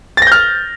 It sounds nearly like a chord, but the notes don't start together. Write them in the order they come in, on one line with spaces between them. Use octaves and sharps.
A6 A#6 G6 F6